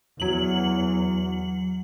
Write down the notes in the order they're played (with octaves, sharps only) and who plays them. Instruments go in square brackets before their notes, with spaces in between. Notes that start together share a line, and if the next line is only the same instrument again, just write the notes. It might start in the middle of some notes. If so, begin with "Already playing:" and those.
[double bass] E2 [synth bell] F#3 F#7